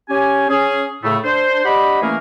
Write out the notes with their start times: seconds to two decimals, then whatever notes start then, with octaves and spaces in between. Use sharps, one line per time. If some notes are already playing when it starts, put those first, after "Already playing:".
0.10 C#4 G4 G#5
0.49 C#4 G#4
1.04 A2 C#3 A3
1.25 D4 C5
1.65 D4 G4 D#5 F#5 B5
2.02 E3 A3 A#3 C#4 G#4 A#4